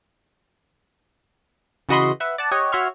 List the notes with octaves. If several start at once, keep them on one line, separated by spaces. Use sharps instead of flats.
C#3 E3 F#4 D#5 B5 C6
B4 E5 F#5
D5 F#5 A5
G4 C#5 D#5 F#5
F#4 C#5 E5 C6 C#6 F6